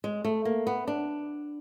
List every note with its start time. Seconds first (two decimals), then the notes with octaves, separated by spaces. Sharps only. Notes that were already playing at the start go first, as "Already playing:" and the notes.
0.04 G#3
0.24 A3
0.45 A#3
0.67 B3
0.88 D4